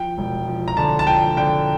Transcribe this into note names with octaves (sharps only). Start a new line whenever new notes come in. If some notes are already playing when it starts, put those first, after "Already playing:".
Already playing: F3 G5
E1
F3
A#5
D3 A5
A5
F3 G5
D3 G5